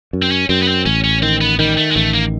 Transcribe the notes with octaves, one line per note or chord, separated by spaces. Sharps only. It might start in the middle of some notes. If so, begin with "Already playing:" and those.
F#2
C4
C#4
F#2 C4
B3
C4
A1 C#4
C#4
D#3 C4
B3
D#3 G3
A3
G#3
A1 A3
A#3